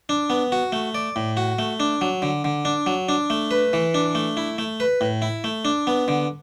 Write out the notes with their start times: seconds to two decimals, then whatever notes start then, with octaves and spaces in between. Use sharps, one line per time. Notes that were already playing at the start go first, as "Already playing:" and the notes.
0.09 D4
0.30 B3
0.52 F#4
0.72 A3
0.95 D5
1.16 A2
1.37 F#4
1.59 A3
1.80 D4
2.01 F#3
2.22 D3
2.44 D3
2.65 D4
2.86 F#3
3.09 D4
3.30 A3
3.51 B4
3.73 E3
3.94 D4
4.15 A3
4.37 E4
4.58 A3
4.80 B4
5.01 A2
5.22 E4
5.44 A3
5.65 D4
5.87 B3
6.08 D3